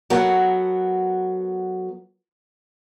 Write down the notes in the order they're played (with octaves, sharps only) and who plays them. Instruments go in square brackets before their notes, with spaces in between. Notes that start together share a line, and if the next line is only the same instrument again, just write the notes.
[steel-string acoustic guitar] F#3 B3 A4 A#4 F#5